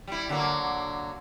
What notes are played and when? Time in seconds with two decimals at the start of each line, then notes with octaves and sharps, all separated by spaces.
0.07 G3 E4
0.29 D3 F#3 A#3